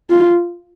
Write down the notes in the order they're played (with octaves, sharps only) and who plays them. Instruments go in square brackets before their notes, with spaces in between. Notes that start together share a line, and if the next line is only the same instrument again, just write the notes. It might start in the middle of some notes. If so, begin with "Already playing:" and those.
[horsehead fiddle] F4